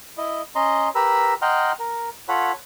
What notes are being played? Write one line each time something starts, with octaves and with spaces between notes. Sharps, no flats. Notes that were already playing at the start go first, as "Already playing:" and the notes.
E4 D#5
C#4 D#5 A#5 C6
G4 A#4 B4 A#5 B5 E6
D#5 F#5 G5 A#5 C6 F6
A#4
F4 A4 C#5 F#5 B5